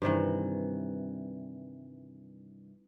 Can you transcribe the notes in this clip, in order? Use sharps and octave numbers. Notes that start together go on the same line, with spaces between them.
G2 C3 D#3 E3